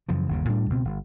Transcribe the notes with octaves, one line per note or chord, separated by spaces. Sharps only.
F#2 C#3 E3 F3
G1 D#2 C#3
A2 G3 D4
C#2 B2 C4
G1